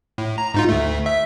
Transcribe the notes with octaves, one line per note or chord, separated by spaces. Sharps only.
A2
A#5
G#2 D#4 F4
D2 A3
E5